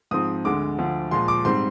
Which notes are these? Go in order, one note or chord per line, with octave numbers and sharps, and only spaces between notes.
G#2 F3 C4 D#6
D2 D3 G#3 D6
D2 D3 F3
A#2 F3 G#3 C6
D6
G#2 G3 C4 C6